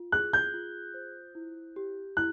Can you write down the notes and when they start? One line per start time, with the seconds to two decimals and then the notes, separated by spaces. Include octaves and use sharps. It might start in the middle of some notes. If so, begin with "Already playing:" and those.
Already playing: F4
0.12 G#4 F#6
0.33 G6
0.54 F4
0.94 C5
1.35 E4
1.76 G4
2.17 E4 F#6